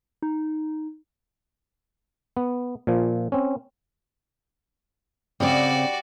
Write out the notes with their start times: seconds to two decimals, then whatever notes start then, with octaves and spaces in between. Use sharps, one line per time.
0.22 D#4
2.37 B3
2.87 A#2 F3
3.32 C4 C#4
5.40 C#3 G3 C4 F#4 D5